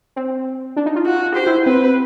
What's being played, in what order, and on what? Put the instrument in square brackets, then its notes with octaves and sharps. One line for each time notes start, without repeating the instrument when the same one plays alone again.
[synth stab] C4
D4
D#4
F4
[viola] F#4
[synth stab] G4 [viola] C5
[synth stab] E4
[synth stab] C4 [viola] B4